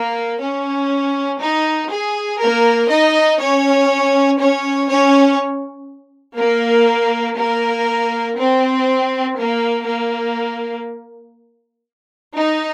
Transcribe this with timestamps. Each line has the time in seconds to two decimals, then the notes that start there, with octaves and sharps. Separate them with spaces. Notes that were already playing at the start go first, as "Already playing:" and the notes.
Already playing: A#3
0.41 C#4
1.41 D#4
1.90 G#4
2.40 A#3 A#4
2.89 D#4 D#5
3.39 C#4 C#5
4.39 C#4 C#5
4.88 C#4 C#5
6.38 A#3 A#4
7.37 A#3 A#4
8.37 C4
9.37 A#3
9.86 A#3
12.35 D#4